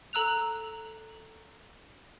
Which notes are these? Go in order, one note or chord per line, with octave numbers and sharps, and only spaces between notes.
A4 A#5 E6 F#6 F7